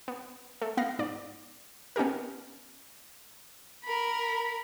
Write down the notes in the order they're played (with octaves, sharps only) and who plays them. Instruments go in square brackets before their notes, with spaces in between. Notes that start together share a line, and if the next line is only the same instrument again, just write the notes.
[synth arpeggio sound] B3
A3
B3 F5 F#5 A#6
G#2 D5
B3 C#4 D#4 G4 A#4
[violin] A#4 B5